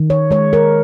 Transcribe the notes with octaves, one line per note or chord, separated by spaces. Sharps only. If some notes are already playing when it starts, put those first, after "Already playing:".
Already playing: D#3
C#5
G#3 C#5
A#4